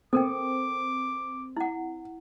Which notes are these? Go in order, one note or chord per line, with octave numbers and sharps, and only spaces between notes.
C4 A4 A#4 G5 D6
E4 F#5